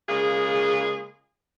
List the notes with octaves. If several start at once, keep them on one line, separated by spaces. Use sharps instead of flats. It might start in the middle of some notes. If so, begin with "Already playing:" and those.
C#3 G#3 A#3 F4 G#4